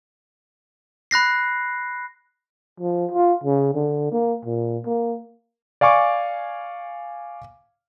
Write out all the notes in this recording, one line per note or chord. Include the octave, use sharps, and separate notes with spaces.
B5 F#6 A#6 C7
F3
F4
C#3
D3
A#3
A#2
A#3
D5 F5 G#5 C#6 D6